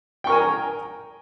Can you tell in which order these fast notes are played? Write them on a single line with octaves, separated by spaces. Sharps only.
G5 C#6 A#4 G#5 A#5